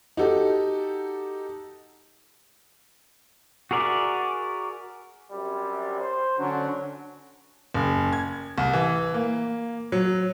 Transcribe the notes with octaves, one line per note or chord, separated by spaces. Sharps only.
D#4 F#4 G4 A4
F#4 G#4 A#4 D5 E5
F#2 C3 G3
C5
D3 F#3 C#4 D4
F#1
G#6
C2
E3
A#3
F#3